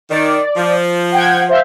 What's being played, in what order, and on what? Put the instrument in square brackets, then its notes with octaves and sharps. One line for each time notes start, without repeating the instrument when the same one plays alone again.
[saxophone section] D#3 [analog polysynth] D5
[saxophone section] F3
[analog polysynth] F#5 G5 G#6
C5 E5 F5